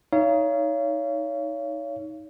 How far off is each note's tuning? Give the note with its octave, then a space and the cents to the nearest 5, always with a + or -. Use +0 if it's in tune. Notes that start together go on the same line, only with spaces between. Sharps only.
D#4 +15 C#5 +25 F5 -35